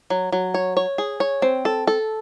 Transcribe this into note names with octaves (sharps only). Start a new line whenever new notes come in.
F#3
F#3
C#5
C#5
G#4
C#5
C4
A4
A4